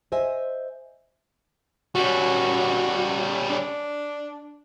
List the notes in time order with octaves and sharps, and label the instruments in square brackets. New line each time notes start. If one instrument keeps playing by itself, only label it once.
[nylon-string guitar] C5 D#5 E5 G#5
[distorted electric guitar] G3 C#4 [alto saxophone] F#4
[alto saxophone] D4